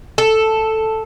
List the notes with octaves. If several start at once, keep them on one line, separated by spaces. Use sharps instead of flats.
A4